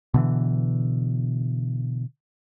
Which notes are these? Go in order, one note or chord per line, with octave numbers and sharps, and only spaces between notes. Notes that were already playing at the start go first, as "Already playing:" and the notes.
B2 D3 E3